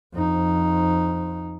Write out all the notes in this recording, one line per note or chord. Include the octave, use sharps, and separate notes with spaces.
F2 D#4